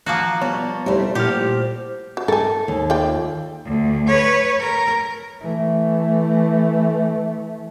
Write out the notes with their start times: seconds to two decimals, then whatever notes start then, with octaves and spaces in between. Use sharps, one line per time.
0.06 F3 A#3 F#4
0.41 G3 B3 C#5
0.86 G3 A3 E4 C5
1.15 A#2 F3 E4 F#4 G4 F6
2.17 F#4
2.28 A4 A#4 G#5
2.68 D#2
2.90 F4 D5 G5
3.65 D2
4.07 B4 C#5
4.60 A#4
5.41 E3 A3